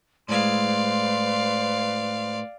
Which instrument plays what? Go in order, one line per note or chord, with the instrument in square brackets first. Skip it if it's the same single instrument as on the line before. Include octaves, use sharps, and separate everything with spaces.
[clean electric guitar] A2 G#3 [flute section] B4 C5 C6 [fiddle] D5 F5